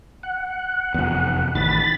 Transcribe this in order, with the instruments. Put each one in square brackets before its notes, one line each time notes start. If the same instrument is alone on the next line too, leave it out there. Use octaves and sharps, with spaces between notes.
[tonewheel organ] F#5
[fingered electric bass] F1 E2
[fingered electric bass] A1 D#3 [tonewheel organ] B5 A6